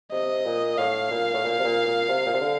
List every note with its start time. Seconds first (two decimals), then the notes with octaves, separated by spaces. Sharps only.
0.12 C3 D#5
0.45 A#2
0.78 A2 F5
1.11 A#2
1.34 A2
1.44 A#2
1.59 C3
1.64 A#2
1.87 A#2
2.09 C3
2.26 A#2
2.33 C3
2.41 D3